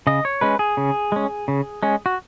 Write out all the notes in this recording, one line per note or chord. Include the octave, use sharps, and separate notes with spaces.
C#3 D#5
C#5
G#3 C#4 B4
G#4
C#3
G#3 C#4
C#3
G#3 C#4
F#4